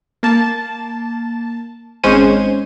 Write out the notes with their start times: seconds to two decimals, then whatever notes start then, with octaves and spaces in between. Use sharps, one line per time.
0.23 A#3 A5
2.04 G#1 G#3 C#4 C5 C#6 D#7